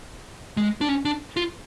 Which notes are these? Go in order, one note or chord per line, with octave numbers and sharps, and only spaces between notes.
G#3
D4
C#4
D4
F4